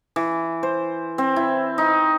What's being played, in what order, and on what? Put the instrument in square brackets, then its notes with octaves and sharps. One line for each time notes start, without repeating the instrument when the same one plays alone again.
[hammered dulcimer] E3
C5
C4
E4
D#4